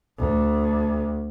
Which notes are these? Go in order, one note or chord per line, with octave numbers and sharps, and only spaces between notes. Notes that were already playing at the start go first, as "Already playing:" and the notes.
D2